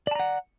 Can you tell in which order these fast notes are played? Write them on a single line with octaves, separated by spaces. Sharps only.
D5 A5 A#5 F#5